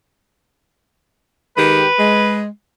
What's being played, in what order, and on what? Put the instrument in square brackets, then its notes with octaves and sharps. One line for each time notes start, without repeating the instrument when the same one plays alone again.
[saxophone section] D#3 G#3 G4 [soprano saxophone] B4
[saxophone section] G#3